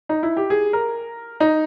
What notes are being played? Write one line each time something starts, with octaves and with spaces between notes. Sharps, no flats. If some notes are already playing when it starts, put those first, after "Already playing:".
D#4
E4
G4
G#4
A#4
D#4